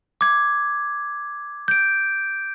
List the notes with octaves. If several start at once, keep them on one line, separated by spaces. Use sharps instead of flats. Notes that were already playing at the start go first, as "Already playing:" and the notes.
D6 G#6
G6 D7